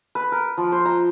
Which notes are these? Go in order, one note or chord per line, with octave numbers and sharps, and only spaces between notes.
B4
A#4
F3
C5
A#5